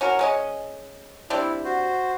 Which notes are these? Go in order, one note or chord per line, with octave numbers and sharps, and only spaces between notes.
C#4 F#4 A#4
G#3 C#4 D#5
G3 C4 D4 E4
F#4 C5